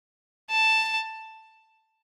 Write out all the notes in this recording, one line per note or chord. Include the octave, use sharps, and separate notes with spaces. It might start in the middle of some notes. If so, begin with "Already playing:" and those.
A5